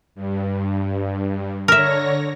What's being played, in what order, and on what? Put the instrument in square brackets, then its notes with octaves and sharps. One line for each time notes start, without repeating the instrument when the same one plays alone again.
[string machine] G2
[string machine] D3 C#5 A#6 [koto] A#4 E5